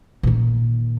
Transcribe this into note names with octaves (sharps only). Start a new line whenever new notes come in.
A#2 D#3